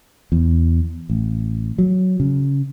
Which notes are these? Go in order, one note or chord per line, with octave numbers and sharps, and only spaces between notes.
E2
A1
F#3
C#3